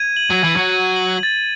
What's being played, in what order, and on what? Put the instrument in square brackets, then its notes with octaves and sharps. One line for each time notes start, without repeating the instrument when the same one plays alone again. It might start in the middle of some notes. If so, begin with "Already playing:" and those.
Already playing: [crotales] G#6 D#7
F#7
[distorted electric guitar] F#3
[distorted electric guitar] E3 [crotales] G#6
[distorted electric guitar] F#3
[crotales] D#7
F#7
A6